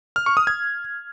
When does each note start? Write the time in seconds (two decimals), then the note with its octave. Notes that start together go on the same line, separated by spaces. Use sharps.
0.16 F6
0.26 C#6
0.37 D#6
0.47 G#6